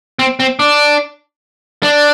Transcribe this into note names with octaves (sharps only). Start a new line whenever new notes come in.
C4
C4
D4
D4